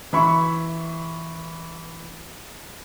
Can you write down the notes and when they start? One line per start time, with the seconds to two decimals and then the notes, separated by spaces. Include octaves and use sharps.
0.13 E3 E5 B5 C#6